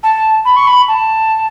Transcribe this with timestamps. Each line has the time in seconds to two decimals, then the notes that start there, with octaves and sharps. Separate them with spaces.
0.03 A5
0.45 B5
0.56 C#6
0.67 B5
0.88 A5